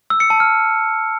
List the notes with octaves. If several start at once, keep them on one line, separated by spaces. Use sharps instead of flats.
E6
C#7
A5
F6